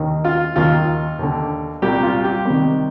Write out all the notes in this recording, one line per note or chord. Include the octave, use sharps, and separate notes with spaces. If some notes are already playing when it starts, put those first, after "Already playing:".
Already playing: D#2 D#3
F4
D#2 D#3 F4
D#2 D3
C2 A#2 G4
F4
G4
C2 C3 D#3